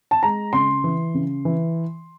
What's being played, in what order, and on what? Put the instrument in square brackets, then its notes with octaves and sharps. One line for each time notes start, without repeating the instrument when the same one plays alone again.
[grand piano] A5
G#3 A#5
C#3 C6
E3
C#3
E3